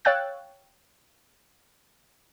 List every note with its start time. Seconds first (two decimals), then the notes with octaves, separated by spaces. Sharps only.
0.05 C#5 F5 G5 E6 F#6 A6